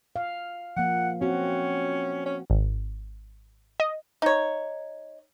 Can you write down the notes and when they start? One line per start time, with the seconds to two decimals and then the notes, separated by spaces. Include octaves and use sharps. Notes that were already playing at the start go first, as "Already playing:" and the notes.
0.16 F5
0.77 F3 A#3 F#5
1.21 C4 C#4 F#4
2.26 C#4
2.50 G#1
3.80 D#5
4.22 D#4 C#5